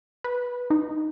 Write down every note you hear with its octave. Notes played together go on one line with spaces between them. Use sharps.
B4
D#4